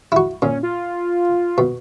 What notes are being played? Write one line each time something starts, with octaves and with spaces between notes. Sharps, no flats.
E4 F#4
A#2 C#4
F4
B2